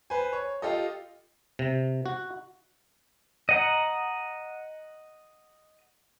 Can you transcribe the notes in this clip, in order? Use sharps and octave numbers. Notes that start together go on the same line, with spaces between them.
B4 C5 G#5
C#5
F4 G4 A4 D#5
C3
F#4
D#5 F#5 A#5